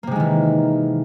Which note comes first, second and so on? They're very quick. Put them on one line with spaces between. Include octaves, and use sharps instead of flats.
A#3 C3 G#3 D#3 E3